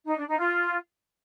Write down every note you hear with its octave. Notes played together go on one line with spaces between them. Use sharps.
D#4
D4
D#4
F4